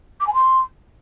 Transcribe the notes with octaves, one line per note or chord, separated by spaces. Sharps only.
D6
G#5
C6